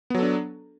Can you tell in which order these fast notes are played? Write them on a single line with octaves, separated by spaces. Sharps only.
B3 F#3 A4 D4